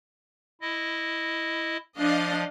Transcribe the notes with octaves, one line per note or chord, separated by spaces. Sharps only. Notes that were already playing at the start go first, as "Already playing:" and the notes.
E4 D#5
F3 D4 D#5 F5